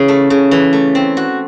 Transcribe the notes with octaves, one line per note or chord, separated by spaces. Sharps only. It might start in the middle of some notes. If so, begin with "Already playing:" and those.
Already playing: C#3 E3
A3
C#3
E3
A3
C4
F#4